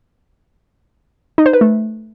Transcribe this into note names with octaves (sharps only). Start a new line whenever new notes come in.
D#4
C5
B4
A3